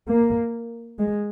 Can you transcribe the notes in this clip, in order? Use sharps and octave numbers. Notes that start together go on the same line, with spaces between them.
A#3
G#3